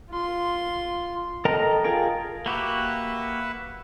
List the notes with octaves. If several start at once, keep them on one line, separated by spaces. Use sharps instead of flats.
F4 C6
A4 A#4 D#5 G5 A#5
F4 G#4 A#4 G5
A#3 F#4 G4 B4 E5 F#5